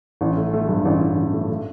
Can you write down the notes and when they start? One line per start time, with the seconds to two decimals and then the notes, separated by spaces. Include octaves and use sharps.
0.21 A1
0.37 A3
0.53 A3
0.69 G2
0.85 A1
1.01 A1
1.17 A1
1.33 A3
1.48 A3